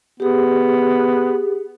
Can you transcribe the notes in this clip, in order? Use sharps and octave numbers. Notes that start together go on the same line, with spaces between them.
B3 G4 G#4